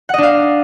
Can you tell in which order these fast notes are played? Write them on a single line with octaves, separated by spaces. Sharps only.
F#5 D#5 D4 F5